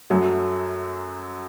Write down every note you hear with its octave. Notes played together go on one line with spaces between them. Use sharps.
F#2 F#3 A3